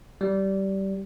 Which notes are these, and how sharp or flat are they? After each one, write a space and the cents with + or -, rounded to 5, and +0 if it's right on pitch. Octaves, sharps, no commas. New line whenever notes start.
G3 -15